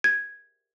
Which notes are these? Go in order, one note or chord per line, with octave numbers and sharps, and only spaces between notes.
G#6